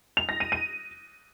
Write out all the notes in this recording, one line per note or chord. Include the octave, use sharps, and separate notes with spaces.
F7
A#6
D#7
D#7